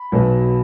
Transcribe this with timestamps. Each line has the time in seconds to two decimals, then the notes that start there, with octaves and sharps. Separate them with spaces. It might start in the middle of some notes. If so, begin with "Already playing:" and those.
Already playing: B5
0.12 B1 B2 F#3